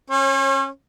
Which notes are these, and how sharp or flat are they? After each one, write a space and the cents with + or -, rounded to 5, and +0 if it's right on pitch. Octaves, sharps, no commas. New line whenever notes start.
C#4 -30 C#5 -45